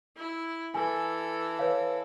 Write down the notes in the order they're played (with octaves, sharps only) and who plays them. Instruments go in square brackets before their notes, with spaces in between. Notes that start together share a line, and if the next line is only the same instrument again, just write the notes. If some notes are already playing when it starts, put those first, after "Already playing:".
[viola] E4
[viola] E3 A4 [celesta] G#5
[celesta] B4 C#5 F5